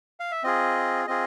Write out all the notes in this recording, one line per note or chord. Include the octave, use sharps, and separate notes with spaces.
F5
E5
C4 F4 G#4 D#5
C4 F4 G#4 D#5